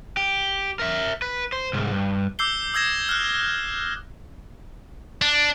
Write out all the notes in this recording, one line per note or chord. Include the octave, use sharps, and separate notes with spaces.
G4
A#4 E5
B4
C5
C2 G#2
G2
D6 E6 G6 C7 G7
D#6 E6 G#6 A#6 E7
F6 F#6
D4